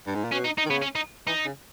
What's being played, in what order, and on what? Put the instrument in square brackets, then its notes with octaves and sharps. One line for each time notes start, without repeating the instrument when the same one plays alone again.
[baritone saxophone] G2
G#2
A#2
[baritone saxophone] B2 [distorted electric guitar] C#4
[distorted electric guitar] D#4
D#4
[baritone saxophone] D#3
[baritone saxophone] C#3 [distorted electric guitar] B3
[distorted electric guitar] C#4
D#4
[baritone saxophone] E3 [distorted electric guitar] D#4
[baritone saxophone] C#3